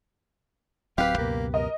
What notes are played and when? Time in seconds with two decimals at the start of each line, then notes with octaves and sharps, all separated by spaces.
0.98 D1 F#3 C4 G4 B4 F5
1.18 C#2 F#2 B2 A#3
1.54 A#4 D#5